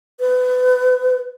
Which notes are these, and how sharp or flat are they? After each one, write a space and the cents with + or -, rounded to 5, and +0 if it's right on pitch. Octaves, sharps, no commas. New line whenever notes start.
B4 +30